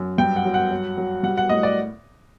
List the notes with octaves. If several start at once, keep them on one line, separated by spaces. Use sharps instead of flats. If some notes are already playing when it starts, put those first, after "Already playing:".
Already playing: F#2
G2 G5
F#5
F#3
F#5
F#3
F#3
G3 F#5
F#5
A2 D#5
D5